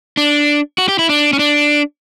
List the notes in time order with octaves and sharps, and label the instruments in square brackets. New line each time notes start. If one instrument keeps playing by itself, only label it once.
[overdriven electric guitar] D4
F#4
G4
E4
D4
C#4
D4